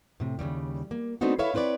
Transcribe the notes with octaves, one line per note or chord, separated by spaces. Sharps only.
A2 C3
D#2 G#2 C#3 G3
A#3
A3 B3 C4 D4 D#4 F#4
E4 A4 B4 C#5 E5 F5
C4 E4 B4 C#5 D5